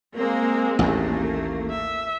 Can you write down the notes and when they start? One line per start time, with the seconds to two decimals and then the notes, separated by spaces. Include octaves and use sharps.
0.16 G#3 A#3 C4
0.79 A1 D#2 A3 A#3
1.70 E5